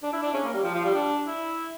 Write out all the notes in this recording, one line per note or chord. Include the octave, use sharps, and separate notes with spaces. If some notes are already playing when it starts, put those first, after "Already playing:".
D4
E4
D4
C#4
A#3
G3
F3
F3
G3
D4
E4